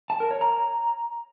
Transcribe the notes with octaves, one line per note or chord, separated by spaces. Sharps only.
A5
A#4
C#5
A#5